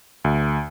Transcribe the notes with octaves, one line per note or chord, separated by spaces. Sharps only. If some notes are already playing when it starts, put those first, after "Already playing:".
D2